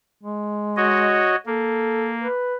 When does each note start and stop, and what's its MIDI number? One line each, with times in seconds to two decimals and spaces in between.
0.23 1.35 56
0.77 1.36 66
0.77 1.36 73
0.77 1.36 75
1.46 2.27 58
1.46 2.14 69
2.23 2.56 71